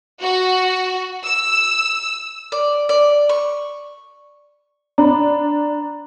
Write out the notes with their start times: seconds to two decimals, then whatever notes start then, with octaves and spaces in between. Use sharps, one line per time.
0.22 F#4
1.25 E6
2.52 D5
2.89 D5
3.29 C#6
4.98 D4 A#5 B5